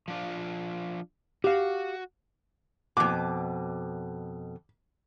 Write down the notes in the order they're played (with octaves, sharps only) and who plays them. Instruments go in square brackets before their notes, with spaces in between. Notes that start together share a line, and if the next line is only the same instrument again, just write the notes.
[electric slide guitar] F3 D4 F4
[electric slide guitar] F#4 [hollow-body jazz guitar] G4 F5
[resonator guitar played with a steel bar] F2 B2 [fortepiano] D6